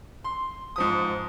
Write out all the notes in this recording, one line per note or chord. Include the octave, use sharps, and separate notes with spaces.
C6
G#2 F3 D#6